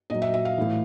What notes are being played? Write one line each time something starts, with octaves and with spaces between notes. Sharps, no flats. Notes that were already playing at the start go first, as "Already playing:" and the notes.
A#2 F#3 D#5
E5
E5
F5
A2 E3